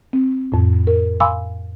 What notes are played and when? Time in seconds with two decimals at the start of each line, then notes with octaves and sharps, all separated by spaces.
0.13 C4
0.52 F2 A2
0.87 A#4
1.20 F5 G#5 B5 C6 D6 E6